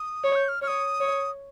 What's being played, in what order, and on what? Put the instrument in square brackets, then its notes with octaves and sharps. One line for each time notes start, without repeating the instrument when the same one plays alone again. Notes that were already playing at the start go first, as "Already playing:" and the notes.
Already playing: [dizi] D#6
[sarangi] C#5
[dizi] G6
F6
[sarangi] C#5 [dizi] F6
[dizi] D#6
[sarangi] C#5